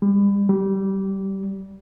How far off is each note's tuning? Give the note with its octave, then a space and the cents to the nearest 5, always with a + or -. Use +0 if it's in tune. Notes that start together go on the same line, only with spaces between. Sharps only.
G3 +35
G3 -20